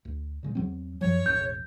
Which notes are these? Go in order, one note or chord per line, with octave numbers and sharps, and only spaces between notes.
D2
A#2 C#3 G#3
E2 F#3 C4
F#2 F3 F#3 C#5
E1 A1 D#2 G6